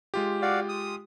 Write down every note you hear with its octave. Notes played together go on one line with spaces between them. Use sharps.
G#3 F4 G4
F#4 D5 F5
D#6